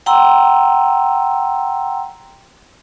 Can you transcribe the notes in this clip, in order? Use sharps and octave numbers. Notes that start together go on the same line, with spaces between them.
F#5 G5 A#5 C6 E6